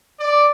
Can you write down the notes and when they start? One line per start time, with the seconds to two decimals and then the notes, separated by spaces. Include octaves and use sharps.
0.19 D5